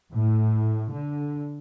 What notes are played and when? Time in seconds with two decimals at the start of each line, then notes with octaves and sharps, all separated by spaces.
0.13 A2
0.91 D3